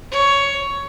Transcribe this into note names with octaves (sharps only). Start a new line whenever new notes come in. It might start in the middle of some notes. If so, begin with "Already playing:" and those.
C#5